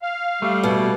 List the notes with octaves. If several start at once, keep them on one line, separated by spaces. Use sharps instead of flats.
F5
G3 A3
B2